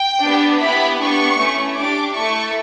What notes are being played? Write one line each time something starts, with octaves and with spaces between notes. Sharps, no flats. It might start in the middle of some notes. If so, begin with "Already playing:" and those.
Already playing: G5
B3 D4 G4
B3 E4 G4 B5
B3 D4 G4 C#6
A3 C#4 E4
D4 G4 D6
A3 E4 A4 C#6